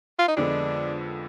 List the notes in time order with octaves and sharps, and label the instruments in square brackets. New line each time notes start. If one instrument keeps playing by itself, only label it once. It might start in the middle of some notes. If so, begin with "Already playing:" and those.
[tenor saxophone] F4
D#4
[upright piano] F2 D3 G#3 B3 [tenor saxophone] D4